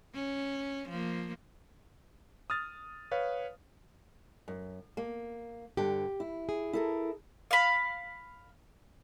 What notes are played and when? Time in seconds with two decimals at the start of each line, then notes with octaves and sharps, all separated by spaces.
0.15 C#4
0.89 F3 A#3
2.50 D#6 F6 A6
3.12 B4 C#5 F5
4.48 F#2
4.97 A#3
5.77 G2 D3 G4
6.20 E4
6.49 G#4
6.73 E4 A4 A#4
7.51 F5 B5